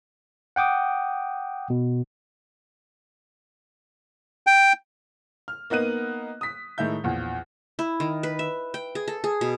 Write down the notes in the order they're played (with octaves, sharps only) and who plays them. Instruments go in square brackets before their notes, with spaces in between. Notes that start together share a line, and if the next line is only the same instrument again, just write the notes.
[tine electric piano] F#5 G5 D6 D#6
B2
[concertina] G5
[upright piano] F6
A#3 B3 D#4 F#6 D#7
D#6 B6
A2 D#3 G#3 E5 G6
A#1 E2
[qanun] E4
D#3
B4
E5
G5
G#4
A4
G#4
B2